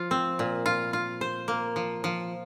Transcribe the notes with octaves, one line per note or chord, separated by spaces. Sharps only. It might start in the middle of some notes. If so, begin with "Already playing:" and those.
Already playing: F3 F4
C4
A#2
F4
F4
C5
A#3
F3
F3